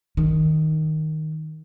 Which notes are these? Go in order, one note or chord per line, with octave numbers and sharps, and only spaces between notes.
D#3